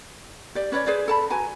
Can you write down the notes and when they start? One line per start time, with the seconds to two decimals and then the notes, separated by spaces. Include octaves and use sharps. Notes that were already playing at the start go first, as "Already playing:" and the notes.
0.55 G4 D5
0.72 C#4 B4 C#5 D5
0.87 G#4 B4 C5 D5
1.08 A4 A5 B5
1.30 F#4 B4 G#5 A#5